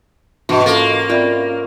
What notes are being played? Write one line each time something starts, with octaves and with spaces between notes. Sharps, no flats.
G#2 B2 E3 D4 F#4 C5 E5
A#3 C#4 F4 A4 A#4 F5
C4 F4 D5 E5 G5 B5